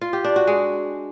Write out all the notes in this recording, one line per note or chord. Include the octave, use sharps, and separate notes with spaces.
F4
G4
D4
F#4
G#3